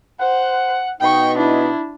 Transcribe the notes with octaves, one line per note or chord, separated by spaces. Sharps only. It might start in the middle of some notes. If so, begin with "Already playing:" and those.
C5 F#5
B2 B3 D#4 G5 C#6
D4 E4